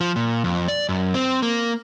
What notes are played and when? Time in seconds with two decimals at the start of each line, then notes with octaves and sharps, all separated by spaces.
0.01 F3
0.16 A#2
0.44 F2
0.68 D5
0.89 F#2
1.14 C4
1.42 A#3